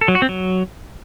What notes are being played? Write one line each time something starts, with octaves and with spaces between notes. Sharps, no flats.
A4
F#3
F#4
C4
F#3